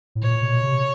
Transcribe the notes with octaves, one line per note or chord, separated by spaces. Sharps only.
A2
A#2 C#5
B2
C3